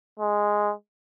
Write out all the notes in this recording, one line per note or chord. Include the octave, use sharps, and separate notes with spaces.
G#3